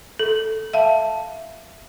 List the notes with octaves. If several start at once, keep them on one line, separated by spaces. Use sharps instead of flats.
A4
E5 F5 A5